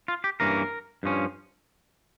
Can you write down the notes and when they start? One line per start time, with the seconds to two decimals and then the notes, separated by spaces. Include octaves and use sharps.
0.08 F4
0.24 G4
0.40 G2 E3 A#3 C#4 A#4
1.03 G2 F3 C#4